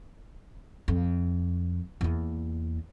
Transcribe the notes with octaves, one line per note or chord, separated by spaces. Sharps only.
F2
E2 A#3